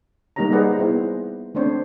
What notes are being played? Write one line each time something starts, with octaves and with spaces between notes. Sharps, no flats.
G3 A#3 D#4 G4 C#5 A#5
G#4 B4 C5 D5 D#5 F#5
B3 E4 G#4 C5
A3 C4 D4 C5 C#5